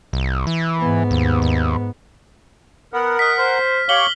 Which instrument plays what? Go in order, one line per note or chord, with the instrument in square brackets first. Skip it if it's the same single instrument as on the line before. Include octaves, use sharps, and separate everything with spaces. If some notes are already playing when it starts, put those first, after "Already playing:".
[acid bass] C2
E3
[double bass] G#2 B3
[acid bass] D#2
D#2
[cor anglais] B3 [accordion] A#4 F#5
[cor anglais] D#5 [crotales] F6 B6
[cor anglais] C5
[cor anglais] G4 [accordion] C#5 F5 C#6 [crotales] F#7 G7